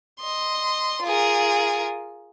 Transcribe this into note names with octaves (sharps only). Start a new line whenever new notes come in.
D#5 C6
F4 G#4 A#4